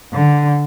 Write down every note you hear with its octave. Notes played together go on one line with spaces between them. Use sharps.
D3